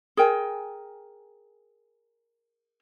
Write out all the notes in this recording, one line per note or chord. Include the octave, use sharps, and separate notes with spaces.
G#4 A#4 G5 G#5